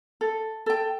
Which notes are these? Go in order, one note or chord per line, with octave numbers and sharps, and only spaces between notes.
A4
A4 G5